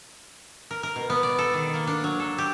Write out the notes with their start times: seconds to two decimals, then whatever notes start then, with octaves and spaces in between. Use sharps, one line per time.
0.71 A#4
0.83 A#4
0.96 B2
1.10 B3
1.23 D5
1.38 A4
1.54 D#3
1.74 A#3
1.87 D4
2.04 F#3
2.20 A4
2.38 G4